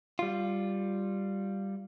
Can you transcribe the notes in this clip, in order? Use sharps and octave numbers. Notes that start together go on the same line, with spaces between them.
G3 F4